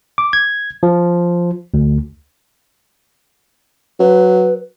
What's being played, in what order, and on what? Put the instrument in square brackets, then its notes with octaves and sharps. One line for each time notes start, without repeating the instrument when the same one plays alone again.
[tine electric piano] D6
G#6
F3
D2
[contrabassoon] F#3 [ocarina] B4